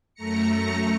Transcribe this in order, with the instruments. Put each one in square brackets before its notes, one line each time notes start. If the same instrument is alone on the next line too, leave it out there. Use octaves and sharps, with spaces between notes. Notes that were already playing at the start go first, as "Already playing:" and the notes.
[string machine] F#2 A3 A#5 A#6 C#7